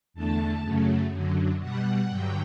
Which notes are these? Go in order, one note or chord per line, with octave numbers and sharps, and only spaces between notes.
E2 D3 A3 A5
F#2 C#3 F#3 A3
F#2 D3 F#3
B2 G3 F#5
G2 D3 F#3 G5